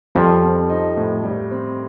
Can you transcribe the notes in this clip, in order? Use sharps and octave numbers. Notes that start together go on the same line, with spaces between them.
F2 F3 G3
C4
D#4
A2
G3
C4